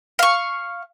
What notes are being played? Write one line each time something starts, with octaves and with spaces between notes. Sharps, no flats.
F5 C#6